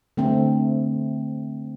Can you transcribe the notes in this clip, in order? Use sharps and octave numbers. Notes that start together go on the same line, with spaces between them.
D3 A3 C4